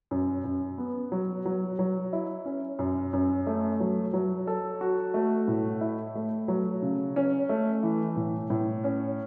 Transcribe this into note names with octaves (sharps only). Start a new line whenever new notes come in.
F#2
F#2
B3
F#3
F#3
F#3
E4
C#4
F#2
F#2
A3
F#3
F#3
A4
F#4
A3
A2
E4
A3
F#3
C#3
C#4
A3
E3
A2
A2
C#4